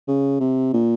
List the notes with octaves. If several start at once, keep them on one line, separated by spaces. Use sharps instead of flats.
C#3
C3
A#2